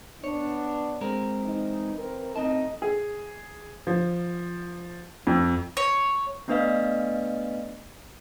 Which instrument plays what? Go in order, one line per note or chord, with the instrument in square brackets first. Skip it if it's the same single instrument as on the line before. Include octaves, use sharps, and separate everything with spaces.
[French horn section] B3 D4 [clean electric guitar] C#5
[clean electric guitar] G#3 C4 A#4
[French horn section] E3 D#4
E3 C4 A#4
[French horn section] A2 D#4 D#5 [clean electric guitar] C4 A5
[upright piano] G#4
F3
F2
[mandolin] C#5
[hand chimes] A3 B3 D4 B4 D#5 F5